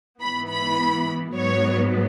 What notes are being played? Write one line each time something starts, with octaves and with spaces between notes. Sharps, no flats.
G#2 E3 B3 B5
B5
G#2 F#3 B3 C#5